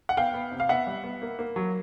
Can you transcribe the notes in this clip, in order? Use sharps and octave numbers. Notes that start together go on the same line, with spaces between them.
F#5
B3 F5 G5
B3
C3
F5
B3 E5 F#5
G3
B3
A#3
A#3
F#3